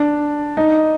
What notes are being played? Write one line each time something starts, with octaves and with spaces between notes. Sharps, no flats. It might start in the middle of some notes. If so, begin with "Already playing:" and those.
Already playing: D4
D#4